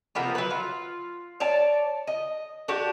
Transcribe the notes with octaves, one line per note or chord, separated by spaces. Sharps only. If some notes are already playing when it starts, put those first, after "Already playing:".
C3 F3 A#3 B3
F#3 B4
F4
C#5 D5 A5
D#5
D4 F#4 G4